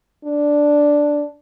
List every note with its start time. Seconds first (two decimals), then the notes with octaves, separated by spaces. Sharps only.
0.25 D4